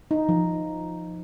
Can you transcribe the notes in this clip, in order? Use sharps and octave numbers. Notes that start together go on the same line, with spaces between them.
D#4
F3